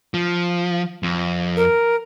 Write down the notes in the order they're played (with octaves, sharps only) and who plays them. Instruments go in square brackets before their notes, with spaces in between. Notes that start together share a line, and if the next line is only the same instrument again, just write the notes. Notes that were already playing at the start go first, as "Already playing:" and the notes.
[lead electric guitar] F3
F2
[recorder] A#4